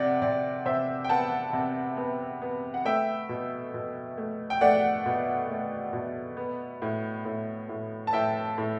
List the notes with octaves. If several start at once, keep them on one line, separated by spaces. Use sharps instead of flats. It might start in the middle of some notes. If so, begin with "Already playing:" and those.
Already playing: C3 D5 F#5
C3 D5
C3 C5 E5
G5
B3 F#5 A5
C3
B3
B3
F#5
A3 E5 G5
B2
B2
A3
G5
A3 D5 F#5
B2
A3
B2
B3
A2
A2
A2
A5
A2 E5 G5
A2